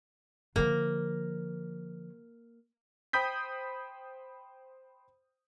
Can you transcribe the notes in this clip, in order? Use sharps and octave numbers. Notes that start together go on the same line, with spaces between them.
D3 F3 A#3
C5 G5 B5 D#6 G6 B6